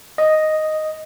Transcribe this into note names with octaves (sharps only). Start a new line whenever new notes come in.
D#5